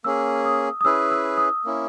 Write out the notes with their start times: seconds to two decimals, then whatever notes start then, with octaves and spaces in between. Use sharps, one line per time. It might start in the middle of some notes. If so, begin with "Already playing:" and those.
0.04 A#3 C#4 G#4 E6
0.45 D#6
0.81 D#6
0.85 C#4 E4 G#4 B4 E6
1.11 E6
1.37 D#6
1.65 A#3 C#4 E4